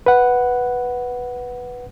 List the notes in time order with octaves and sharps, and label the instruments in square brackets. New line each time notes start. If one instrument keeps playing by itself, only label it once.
[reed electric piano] B4 F#5